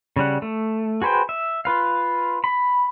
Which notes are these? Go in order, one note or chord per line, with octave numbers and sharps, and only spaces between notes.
C#3 G3 F#5
A3
F#4 G#4 B4 C5 G5
E5
F4 B4 F5
B5